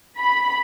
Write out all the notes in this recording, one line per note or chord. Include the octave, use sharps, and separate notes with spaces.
B5